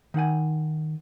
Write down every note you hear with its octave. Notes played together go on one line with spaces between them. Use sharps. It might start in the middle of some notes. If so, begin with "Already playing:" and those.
D#3 D#4 F#5 G#5